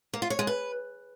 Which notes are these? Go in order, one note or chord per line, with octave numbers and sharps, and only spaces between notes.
A#3
F4
C#5
G#3
B4